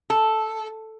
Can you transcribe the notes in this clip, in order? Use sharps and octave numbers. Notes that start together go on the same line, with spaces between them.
A4